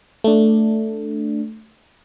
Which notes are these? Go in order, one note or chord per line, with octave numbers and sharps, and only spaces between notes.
A3 D4